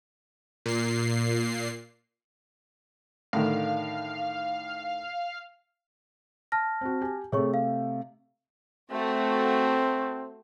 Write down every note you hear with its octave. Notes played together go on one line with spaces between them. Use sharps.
A#2 C7
A2 D3 D#3 F5
A5 F6 A#6
C4 F#4
G4 G#5
C3 A3 G#4 C#5 C#6
F5
A3 C4 F#4